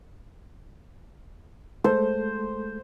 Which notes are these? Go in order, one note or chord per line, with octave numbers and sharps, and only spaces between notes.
G#3 A3 A4 C5